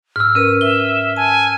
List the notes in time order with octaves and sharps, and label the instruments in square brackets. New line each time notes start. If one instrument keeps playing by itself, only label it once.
[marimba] G#2 [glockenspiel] E6 F6
[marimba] C#4 A#4 B4 [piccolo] D#7
[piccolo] E5 [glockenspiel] G7
[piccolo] G#5 [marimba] A5